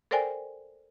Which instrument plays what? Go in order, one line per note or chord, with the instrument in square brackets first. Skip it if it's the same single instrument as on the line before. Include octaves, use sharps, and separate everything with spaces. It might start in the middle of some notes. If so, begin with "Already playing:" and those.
[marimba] A4 A#4 C5 D5 G5 G#5